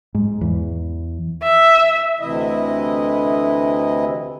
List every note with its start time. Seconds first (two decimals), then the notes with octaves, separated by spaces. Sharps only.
0.15 G#2
0.41 E2
1.43 E5
2.20 D2 C3 E3 E4 D#5